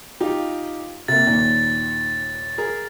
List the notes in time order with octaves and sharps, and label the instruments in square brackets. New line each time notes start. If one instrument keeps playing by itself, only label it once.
[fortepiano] D#4 F4 G4
[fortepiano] C3 A#3 [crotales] A6
[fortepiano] D#2 A#2
G#4 A#4